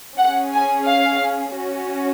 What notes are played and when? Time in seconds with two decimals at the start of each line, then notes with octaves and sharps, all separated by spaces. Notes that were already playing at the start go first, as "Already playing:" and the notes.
0.17 C#4 G#4 F#5
0.53 G#5
0.86 F5
1.56 C#4 F#4